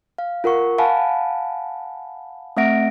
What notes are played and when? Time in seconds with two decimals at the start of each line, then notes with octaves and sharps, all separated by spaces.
0.18 F5
0.44 F4 A#4 F#5 C#6
0.78 F5 F#5 G#5 A5 B5
2.57 A3 C4 E5 F#5 A#6 D7